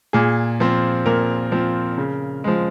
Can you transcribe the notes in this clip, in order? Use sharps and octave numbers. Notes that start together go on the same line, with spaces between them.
A#2 G#4
F3 C4
A#2 A#4
F3 C4
C#3
F3 G#3